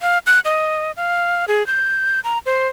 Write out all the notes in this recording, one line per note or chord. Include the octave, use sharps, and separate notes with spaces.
F5
F#6
D#5
F5
G#4
G6
A#5
C5